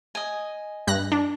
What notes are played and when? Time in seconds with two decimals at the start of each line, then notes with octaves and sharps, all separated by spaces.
0.15 D#5 G#5
0.87 G2 F#6 A#6
1.12 D4